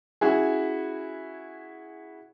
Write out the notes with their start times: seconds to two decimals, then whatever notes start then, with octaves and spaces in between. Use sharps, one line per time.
0.21 C#4 E4 F#4 G#4